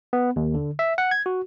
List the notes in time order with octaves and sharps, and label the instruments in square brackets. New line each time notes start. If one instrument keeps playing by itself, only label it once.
[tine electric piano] B3
D#2
D3
E5
F#5
G#6
F#4